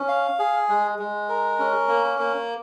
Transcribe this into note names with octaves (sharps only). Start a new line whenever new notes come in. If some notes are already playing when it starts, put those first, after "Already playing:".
Already playing: C#4
F5
G#4
G#3
G#3
A#4
C#4
A#3
A#3